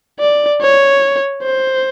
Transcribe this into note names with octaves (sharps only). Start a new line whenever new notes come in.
D5
C#5
C5